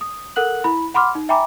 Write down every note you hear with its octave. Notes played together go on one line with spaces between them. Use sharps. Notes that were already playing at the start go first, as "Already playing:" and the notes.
D#6
A4 A#4 F#5 F#6 F#7
E4 B5
F#5 B5 C6 D6 F6
D#4
E5 G5 G#5 A#5 B5 D6